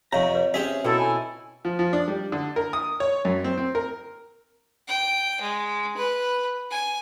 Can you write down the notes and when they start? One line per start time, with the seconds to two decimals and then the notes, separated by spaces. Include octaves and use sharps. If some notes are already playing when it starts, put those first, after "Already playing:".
0.13 F2 C3 C#5 F5 A#5 C#6
0.35 B4 C#5
0.54 C4 C#4 G4 G#4 E5
0.84 B2 D#4 E4 F#4 A4 B4 G5
0.99 G#5 B5
1.65 F3
1.79 F3
1.93 D4
2.08 G3
2.32 D3
2.56 A#4
2.73 D#6
3.00 C#5
3.25 F#2
3.44 C4
3.58 C4
3.75 A#4
4.88 G5
5.41 G#3
5.97 B4
6.71 G#5